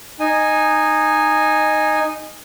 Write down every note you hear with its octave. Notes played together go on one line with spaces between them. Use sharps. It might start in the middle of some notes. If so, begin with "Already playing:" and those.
D#4 G#5